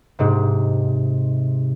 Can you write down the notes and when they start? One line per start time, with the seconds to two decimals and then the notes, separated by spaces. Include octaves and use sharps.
0.19 G#2 C3